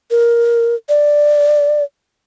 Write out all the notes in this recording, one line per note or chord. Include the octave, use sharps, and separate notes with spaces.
A#4
D5